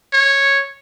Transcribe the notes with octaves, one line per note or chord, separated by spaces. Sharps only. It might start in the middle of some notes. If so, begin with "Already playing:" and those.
C#5